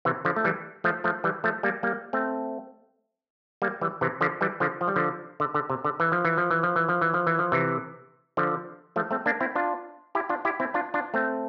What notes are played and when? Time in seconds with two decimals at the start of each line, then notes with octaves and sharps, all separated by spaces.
0.05 C3 E3
0.25 D3 F3
0.36 A3
0.44 E3 G3
0.84 F3 A3
1.04 F3 A3
1.24 E3 G3
1.44 F3 A3
1.63 G3 A#3
1.83 G3 A#3
2.13 A3 C4
3.62 G3 A#3
3.81 E3 G3
4.01 C3 E3
4.21 D3 F3
4.41 E3 G3
4.60 D3 F3
4.81 F3
4.88 G3
4.96 D3 F3
5.40 D3
5.55 D3
5.70 C3
5.84 D3
6.00 E3
6.12 F3
6.25 E3
6.38 F3
6.51 E3
6.63 F3
6.76 E3
6.89 F3
7.01 E3
7.14 F3
7.27 E3
7.39 F3
7.52 C3 E3
8.37 D3 F3
8.96 F3 A3
9.11 A3 C4
9.26 A#3 D4
9.40 C4 E4
9.55 D4 F4
10.15 E4 G4
10.29 D4 F4
10.45 E4 G4
10.60 C4 E4
10.74 D4 F4
10.94 D4 F4
11.14 A3 C4